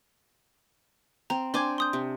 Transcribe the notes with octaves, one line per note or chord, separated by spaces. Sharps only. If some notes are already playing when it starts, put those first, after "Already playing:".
C4 A#5
D4 C5 G#5 C6 D6 G#6
C6 D#6 G6
C3